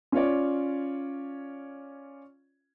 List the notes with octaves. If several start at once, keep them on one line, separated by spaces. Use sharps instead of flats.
C#4 F4 C#5 D5